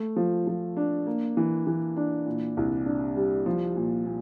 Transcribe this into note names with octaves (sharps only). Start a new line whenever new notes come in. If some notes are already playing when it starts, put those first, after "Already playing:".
Already playing: A3
F3
F3
D4
A#3
E3
E3
D4
A#2
C2
D4
G3
F3
A#2
A#2